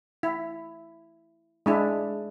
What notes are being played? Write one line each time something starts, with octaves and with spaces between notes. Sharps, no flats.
E4
G#3 D4 E4